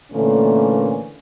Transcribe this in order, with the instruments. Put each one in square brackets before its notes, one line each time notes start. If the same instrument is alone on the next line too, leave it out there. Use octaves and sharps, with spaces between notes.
[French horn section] A#2 D3 E3 A3 A#3 C#4